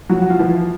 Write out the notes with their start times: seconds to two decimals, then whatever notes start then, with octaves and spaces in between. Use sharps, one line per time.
0.09 F3 F#3 F#4
0.22 F#4
0.30 F4
0.39 E3 F3 E4